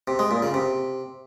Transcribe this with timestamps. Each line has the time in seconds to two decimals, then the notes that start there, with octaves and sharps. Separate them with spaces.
0.08 C3
0.19 G#3
0.31 A#2
0.42 C#3
0.54 C3